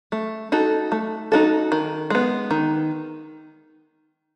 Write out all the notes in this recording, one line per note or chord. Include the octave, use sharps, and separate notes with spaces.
A3
D#4 F#4 A4
A3
D#4 F#4 A4
D#3
G#3 B3
D#3